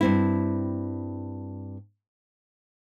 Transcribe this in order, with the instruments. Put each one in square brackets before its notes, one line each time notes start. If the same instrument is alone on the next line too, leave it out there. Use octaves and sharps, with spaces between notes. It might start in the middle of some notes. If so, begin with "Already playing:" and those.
[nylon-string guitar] G2 C4 E4